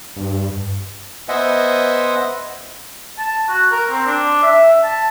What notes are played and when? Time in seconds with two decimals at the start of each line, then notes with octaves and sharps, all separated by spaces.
0.16 G2
1.29 B3 C5 D#5 E5 F#5 G#5
3.18 A5
3.49 F#4
3.72 A#4
3.91 C4
4.07 D4
4.43 E5
4.84 A5